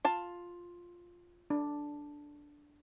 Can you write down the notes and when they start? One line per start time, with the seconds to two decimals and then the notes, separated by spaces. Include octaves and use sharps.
0.05 F4 A5
1.50 D4